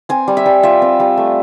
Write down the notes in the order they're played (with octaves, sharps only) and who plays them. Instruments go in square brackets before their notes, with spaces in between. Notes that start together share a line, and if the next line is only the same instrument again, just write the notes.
[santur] C4 G#5
G3
E5
G3
F4 E5
C4
G3
A3